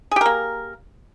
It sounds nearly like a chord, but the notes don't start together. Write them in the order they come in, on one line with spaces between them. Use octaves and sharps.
G#4 G4 A#4 A#3